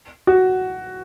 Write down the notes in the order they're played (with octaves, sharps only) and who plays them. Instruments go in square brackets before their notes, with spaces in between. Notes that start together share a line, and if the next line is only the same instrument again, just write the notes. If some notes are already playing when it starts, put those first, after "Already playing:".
[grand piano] F#4